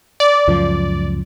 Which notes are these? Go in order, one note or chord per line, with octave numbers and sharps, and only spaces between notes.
D5
C#2 F#2 F3